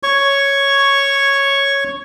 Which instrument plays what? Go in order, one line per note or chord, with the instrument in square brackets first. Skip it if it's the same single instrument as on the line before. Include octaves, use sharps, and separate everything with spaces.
[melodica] C#5 C#6